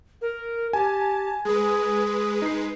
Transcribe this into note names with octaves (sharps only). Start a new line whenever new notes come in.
A#4
G4 G#5 A5
G#3 G#4 B4
D#4 C7